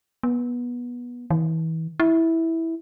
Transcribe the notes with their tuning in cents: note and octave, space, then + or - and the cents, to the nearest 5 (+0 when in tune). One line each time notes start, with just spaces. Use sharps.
B3 -20
E3 -35
E4 -10